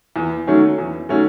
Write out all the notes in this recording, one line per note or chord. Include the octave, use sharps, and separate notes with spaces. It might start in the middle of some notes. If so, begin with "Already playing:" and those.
E2
D#3 F#3 A3 C#4
E2
D#3 F#3 A3 C#4